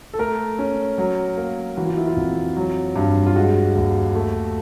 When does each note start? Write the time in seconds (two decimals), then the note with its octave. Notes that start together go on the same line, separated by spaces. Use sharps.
0.14 A4
0.19 A3 A#4
0.59 C#4
0.98 F#3
1.37 A#3
1.77 E3 F#4
1.87 F4
1.98 E4
2.07 F4
2.17 F2
2.57 F#3
2.96 G2
3.26 F4
3.36 G#3 F#4
3.75 D#2
4.15 A3